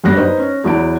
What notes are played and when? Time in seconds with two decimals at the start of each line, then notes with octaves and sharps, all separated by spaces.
0.04 G1 F#2 G3 F#6 A#6
0.17 D#4 B4 C5
0.39 C#4
0.64 E2 F#3 E4 A5 A#5 D7